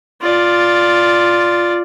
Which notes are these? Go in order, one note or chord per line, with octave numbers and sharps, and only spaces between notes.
F4 D5